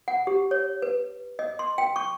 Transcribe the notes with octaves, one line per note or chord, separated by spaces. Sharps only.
F#5
G4
C#5
B4
D#5
C6
G5
C#6